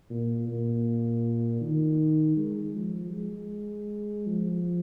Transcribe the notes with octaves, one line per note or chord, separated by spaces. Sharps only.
A#2
A#2
D#3
G#3
F3
G#3
F3